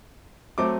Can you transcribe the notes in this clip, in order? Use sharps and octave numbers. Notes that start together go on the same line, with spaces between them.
F#3 A3 C4 D6